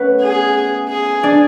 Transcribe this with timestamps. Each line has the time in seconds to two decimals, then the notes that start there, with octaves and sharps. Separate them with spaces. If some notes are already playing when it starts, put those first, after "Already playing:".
Already playing: A3 B3 C#4 A4 B4 C#5
0.22 G#4
0.89 G#4
1.23 D4 D5